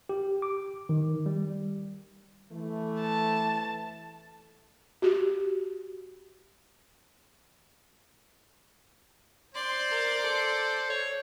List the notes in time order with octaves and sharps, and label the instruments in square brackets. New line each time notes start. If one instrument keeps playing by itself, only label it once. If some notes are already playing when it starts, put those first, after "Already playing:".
[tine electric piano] G4
D6
D#3
G3
[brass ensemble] E3 A3
[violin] A5
[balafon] F#4 G4
[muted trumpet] C5 [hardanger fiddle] D5 C6
[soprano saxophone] A#4
A4
C#5